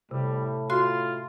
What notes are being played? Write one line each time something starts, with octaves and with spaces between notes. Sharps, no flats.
A2 C3 G3
F4 F#4 C6